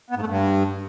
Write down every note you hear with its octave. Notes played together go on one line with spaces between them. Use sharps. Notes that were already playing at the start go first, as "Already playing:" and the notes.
B3
G#2
A3
G2